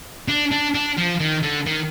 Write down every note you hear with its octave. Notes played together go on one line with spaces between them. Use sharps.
D4
D4
D4
F3
D#3
D3
D#3